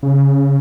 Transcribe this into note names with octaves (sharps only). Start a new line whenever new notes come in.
C#3